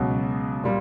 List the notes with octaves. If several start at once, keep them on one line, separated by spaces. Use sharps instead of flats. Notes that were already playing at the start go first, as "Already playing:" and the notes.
Already playing: C#2 B2 F#3
A#2 G3